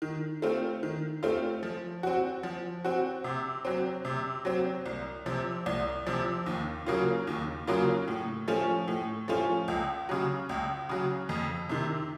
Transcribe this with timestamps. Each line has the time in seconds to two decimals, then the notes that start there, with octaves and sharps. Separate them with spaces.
0.02 D#3
0.42 A3 C4 F4
0.83 D#3
1.23 A3 C4 F4
1.63 F3
2.03 C4 F#4
2.43 F3
2.85 C4 F#4
3.24 C3
3.65 F#3 C4
4.05 C3
4.45 F#3 C4
4.86 C2
5.26 C3 F3
5.66 C2
6.06 C3 F3
6.46 D#2
6.86 C#3 F#3 A#3 F4
7.27 D#2
7.67 C#3 F#3 A#3 F4
8.08 A2
8.48 F3 A3 C#4 F4
8.88 A2
9.28 F3 A3 C#4 F4
9.68 C#2
10.09 C#3 F#3
10.49 C#2
10.89 C#3 F#3
11.29 F2
11.69 C3 D#3